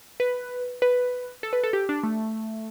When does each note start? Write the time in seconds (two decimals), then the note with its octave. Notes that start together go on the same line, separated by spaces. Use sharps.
0.20 B4
0.82 B4
1.43 A4
1.53 B4
1.63 A4
1.73 G4
1.89 D4
2.03 A3